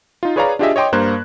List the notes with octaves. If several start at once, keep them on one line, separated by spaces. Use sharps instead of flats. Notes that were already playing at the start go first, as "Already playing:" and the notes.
D#4 F4
G#4 B4 C#5 D5 F5 A#5
D4 F4 G4 G#4 D#5 E5
C#5 D#5 G5 C6 D6
G2 A#3 A#4 C5 F#6 G#6